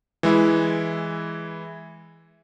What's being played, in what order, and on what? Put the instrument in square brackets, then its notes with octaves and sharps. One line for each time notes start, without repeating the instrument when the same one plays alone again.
[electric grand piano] E3 G#3 E4